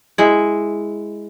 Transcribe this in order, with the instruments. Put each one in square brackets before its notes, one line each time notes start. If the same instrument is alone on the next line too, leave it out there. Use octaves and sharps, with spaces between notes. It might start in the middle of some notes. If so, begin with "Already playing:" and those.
[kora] G#3 E4